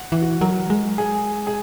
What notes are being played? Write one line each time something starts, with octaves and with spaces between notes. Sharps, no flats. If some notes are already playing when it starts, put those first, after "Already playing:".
Already playing: F#5
E3
F#4
F#3 A#4
G#3
G#4
G#4